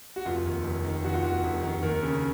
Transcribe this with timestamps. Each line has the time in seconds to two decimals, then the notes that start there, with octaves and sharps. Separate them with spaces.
0.16 F#4
0.25 F1 F4
0.45 D#2
0.65 F1
0.84 D#3
1.04 F1 F#4
1.14 F4
1.23 D#2 F#4
1.43 F1
1.62 D#3
1.83 D#2 A#4
2.02 C#3